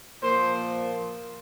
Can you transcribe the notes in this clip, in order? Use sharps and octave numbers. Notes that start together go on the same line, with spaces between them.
A#2 F3 C5